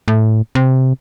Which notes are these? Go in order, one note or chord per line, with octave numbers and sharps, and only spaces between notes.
A2
C3